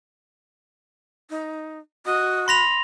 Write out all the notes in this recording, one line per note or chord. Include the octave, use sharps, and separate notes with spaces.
D#4
F#4 D#5
B5 C6 A#6 F7